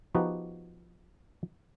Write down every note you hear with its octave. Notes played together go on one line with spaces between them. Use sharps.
F3 B3 D#4 F#4 G4